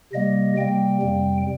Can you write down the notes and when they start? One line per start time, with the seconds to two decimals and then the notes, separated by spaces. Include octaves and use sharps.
0.12 C3 G3 A#3 D#5
0.57 C3 G3 A#3 G5
1.02 F2 C3 G3